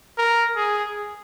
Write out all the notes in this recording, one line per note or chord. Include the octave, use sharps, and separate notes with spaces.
A#4
G#4